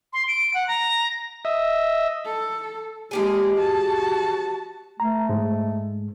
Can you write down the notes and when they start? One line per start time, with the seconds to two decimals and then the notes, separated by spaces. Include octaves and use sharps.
0.13 C6
0.28 D7
0.54 F#5
0.68 A#5
1.45 D#5 E5
2.25 A4
3.11 F3 G#3 A#3 G4 G#4
3.57 F#4 A5
5.00 A3 A#5
5.29 G#2 G#3